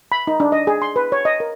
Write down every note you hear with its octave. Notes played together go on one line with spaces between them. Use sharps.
B5
D#4
D4
D#5
G#4
C6
B4
C#5
D#5
A#4